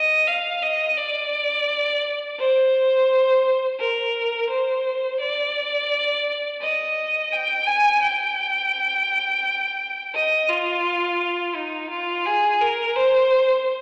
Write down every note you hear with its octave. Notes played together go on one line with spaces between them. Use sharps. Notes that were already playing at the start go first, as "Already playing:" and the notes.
Already playing: D#5
F5
D#5
D5
C5
A#4
C5
D5
D#5
G5
G#5
G5
D#5
F4
D#4
F4
G#4
A#4
C5